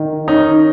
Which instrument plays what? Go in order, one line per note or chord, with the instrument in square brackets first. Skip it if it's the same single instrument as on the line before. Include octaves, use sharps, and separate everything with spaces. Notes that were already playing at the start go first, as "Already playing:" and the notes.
Already playing: [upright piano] D#3
[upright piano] C#4 [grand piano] D#4